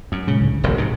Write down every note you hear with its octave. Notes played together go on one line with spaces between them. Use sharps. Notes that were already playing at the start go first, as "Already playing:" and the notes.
F#2
A#2 C#3 G#3 C#4
C#2 A2 D3
E1 A1 C3
G#2 C3